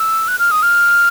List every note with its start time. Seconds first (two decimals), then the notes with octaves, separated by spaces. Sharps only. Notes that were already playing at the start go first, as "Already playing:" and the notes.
Already playing: E6
0.28 F#6
0.39 F6
0.51 D#6
0.63 F6